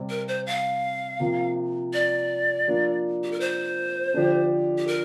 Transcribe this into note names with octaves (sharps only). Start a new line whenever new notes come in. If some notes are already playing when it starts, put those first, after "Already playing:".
Already playing: C3 G3 C4
A#4
C5
F5
C3 F3 A#3
D5
F3 A#3 D4
G4
A#4
C5
D3 F3 D4 G4
G4
A#4